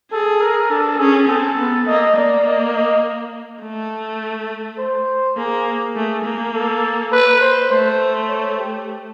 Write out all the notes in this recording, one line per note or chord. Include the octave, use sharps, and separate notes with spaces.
G#4 A4
A#4
D4 A4
C#4 G#4
C4 A4
B3
A#3 D#5
A#3 D5
D#5
D#5
A3
C5
A#3 G#4
A3
A#3
A4
B4
C5
A3 C5
C#5
G4